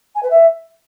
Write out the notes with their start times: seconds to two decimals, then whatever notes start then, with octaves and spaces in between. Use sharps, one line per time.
0.15 G#5
0.22 B4
0.30 E5